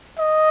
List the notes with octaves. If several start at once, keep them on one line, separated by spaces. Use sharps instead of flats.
D#5